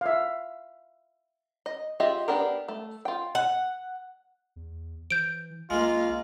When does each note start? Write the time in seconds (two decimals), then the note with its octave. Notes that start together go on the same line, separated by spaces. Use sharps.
0.01 E5 F5
1.66 D#5
2.00 F4 G4 G#4 D#5 E5
2.28 B3 D4 G4 G#4 A#4
2.68 A3
3.05 F4 G5
3.35 F#5
4.56 E2
5.10 E3 G6 D7
5.70 B1 G#3 A#3 F4